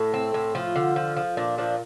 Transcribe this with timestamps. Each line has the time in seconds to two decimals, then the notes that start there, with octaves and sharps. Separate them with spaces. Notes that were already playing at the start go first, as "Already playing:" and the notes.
Already playing: A2 A4
0.14 C4
0.34 A2
0.55 F3 F4
0.76 D3
0.96 F3
1.16 F3
1.37 A#2 D4
1.58 F3 D4